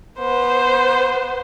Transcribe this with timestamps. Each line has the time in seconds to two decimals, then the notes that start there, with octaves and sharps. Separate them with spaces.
0.19 B3 C5